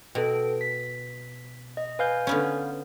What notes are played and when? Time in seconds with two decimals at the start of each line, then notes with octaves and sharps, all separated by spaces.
0.15 B2 A4 G5
0.61 B6
1.77 D#5
1.99 B4 F5 G#5 G6
2.27 D3 B3 C#4